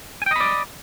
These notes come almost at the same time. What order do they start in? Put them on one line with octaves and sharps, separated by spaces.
G#5 G5 D#5 B5 D5